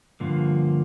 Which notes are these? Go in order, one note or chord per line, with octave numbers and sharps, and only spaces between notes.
G2 D3 F3 A#3